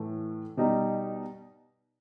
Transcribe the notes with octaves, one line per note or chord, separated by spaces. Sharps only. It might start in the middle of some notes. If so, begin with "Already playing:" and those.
Already playing: A2 E3 A3
B2 G3 D#4